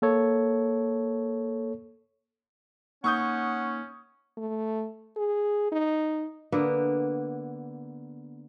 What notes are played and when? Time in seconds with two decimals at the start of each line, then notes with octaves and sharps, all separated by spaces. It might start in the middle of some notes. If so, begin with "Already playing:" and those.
0.02 A#3 A4 C#5
3.04 A#3 C#4 D#4 F#5 C#6 D#6 G6
4.38 A3
5.16 G#4
5.72 D#4
6.52 D3 A#3 B3